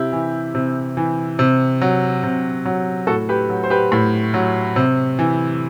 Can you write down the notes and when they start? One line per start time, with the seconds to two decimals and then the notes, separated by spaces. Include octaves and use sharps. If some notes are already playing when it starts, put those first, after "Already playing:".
Already playing: C3 E4 G4
0.12 E3
0.55 C3
0.97 E3
1.39 C3
1.81 F#3
2.23 C3
2.65 F#3
3.07 A2 F#4 A4
3.29 G4 B4
3.49 F#3
3.64 C5
3.70 G4 B4
3.92 A2
4.34 F#3
4.76 C3
5.19 E3